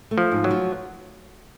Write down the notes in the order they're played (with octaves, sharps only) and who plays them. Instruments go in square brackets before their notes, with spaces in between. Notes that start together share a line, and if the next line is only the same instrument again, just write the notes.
[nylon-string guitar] A3
[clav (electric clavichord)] F3
[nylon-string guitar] G#2
[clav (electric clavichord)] F#3
[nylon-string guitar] F3